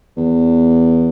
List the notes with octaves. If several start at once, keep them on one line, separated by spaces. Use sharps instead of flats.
E2